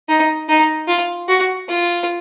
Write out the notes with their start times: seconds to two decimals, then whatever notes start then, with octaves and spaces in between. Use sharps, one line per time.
0.09 D#4
0.49 D#4
0.88 F4
1.28 F#4
1.68 F4